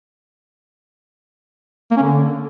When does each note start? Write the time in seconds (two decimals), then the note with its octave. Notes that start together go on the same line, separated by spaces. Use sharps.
1.91 A#3
1.97 C#4
2.02 D3